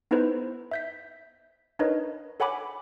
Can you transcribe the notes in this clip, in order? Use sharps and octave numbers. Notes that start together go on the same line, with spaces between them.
B3 D#4 E4 A4 B4 C5
E5 G6 B6
D4 D#4 A#4 B4 C#5 D#5
A4 C#5 F#5 G#5 B5 D6